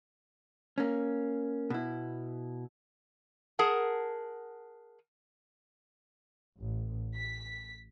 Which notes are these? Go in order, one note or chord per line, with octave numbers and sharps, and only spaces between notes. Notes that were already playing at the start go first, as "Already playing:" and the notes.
A#3 C#4
B2 E4
G#4 A#4 F#5 A5
A1
B6